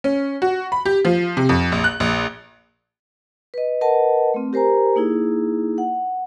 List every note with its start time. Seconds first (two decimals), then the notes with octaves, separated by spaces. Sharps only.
0.04 C#4
0.42 F#4
0.72 B5
0.86 G4
1.05 F3
1.37 C3
1.49 F2
1.72 A#1
1.84 F#6
2.00 A#1
3.54 B4 D#5
3.81 A#4 B4 D#5 F#5 A5
4.34 A3 C4
4.53 G4 A#4 C5 G#5 A#5
4.96 A#3 D#4 E4 G#4
5.78 F#5